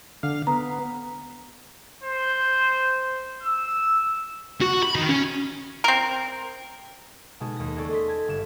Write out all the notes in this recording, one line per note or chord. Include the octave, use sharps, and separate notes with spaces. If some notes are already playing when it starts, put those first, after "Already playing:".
D3 F5
B3 A#5
C5
E6
F#4
B5
D#3
C#4
C4 A#4
B2 G#3 D#4 A5
D#2 A#6
G#3 A#3 C#4 A4 D5
D#5 C6 B6
A5 G#6
G1 E7